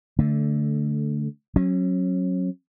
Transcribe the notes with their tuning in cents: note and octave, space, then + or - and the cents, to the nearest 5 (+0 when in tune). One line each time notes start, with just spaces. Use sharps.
D3 -15 A3 +0
F#3 +0 C#4 -30